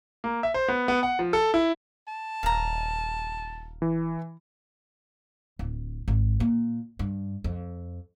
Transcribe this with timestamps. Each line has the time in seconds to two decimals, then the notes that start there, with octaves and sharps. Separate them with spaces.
0.24 A#3
0.43 E5
0.54 C5
0.68 B3
0.88 B3
1.03 F#5
1.19 F3
1.33 A4
1.54 E4
2.07 A5
2.43 D#1 F5 A#5
3.82 E3
5.59 D1
6.08 G#1
6.40 A#2
6.99 G2
7.44 F2